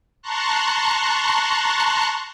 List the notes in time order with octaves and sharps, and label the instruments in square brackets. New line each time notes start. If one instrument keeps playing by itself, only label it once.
[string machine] A5 A#5 C6 C#6 F#6